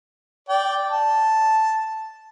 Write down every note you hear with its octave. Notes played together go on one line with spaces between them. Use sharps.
D5 G5
A5